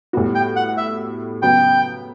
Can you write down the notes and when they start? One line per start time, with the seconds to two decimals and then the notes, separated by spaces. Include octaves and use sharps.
0.13 A2 G3 B3 F#4
0.35 G5
0.56 F#5
0.77 E5
1.42 C#3 F#3 B3 G5